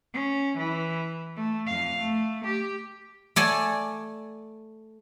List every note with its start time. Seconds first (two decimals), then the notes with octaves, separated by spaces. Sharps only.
0.13 C#4
0.58 E3
1.36 A3
1.66 F2 F5
1.99 A3
2.45 G4
3.36 A3 D5 G#5